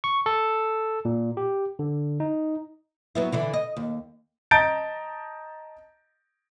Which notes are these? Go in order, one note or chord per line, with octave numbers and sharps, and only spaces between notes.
C#6
A4
A#2
G4
D3
D#4
F#3 B3 E4
D3 E3 E4
D#5
D#2
D#5 A5 A#5 G6 A6 D7